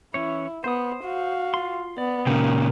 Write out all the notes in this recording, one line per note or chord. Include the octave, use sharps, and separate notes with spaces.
E3 C#4 E4 C#5
B3 C5 D#6
F#4 F5
F4 C6
B3 D5
A#2 C#3 C#4 D#4 A#4 G5